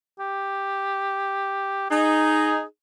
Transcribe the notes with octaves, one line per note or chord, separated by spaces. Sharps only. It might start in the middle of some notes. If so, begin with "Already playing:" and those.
G4
D#4 G#4